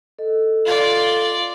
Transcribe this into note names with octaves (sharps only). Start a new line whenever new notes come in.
A4 D#5
F4 D5